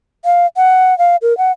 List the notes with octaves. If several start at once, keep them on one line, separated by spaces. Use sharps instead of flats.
F5
F#5
F5
A#4
F#5